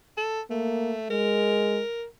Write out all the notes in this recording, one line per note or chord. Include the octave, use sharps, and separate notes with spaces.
A4
A3 A#3
G#3 A#4